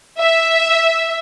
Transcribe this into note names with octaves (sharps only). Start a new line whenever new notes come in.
E5